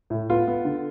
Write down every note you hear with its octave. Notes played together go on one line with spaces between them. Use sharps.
A2
B3 F4
B3
D3